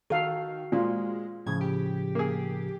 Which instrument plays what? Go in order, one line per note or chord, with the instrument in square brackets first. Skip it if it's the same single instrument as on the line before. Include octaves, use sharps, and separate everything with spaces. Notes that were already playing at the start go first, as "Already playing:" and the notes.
[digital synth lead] D#3 [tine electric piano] F#4 [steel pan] A4 F5
[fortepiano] A#2 [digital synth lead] G#3 [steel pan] F4
[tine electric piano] A2 C#3 F3 [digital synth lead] G#6
[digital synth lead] G4
[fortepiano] A#3 G#4